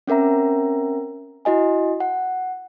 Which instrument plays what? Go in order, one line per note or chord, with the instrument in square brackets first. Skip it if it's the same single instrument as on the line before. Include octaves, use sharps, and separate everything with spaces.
[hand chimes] C4 C#4 A#4 E5 A#5
E4 F#4 D#5 G#5
F#5